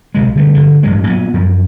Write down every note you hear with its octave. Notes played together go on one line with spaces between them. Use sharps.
B1 C3 G#3
D3 G3 A3
G1 D3 F3
A1 G2 F#3 G#3
A#2 F#3 B3
F#2 F3